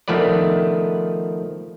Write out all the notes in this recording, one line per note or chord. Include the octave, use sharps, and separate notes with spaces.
D#3 F3 A3 B3 B4 D5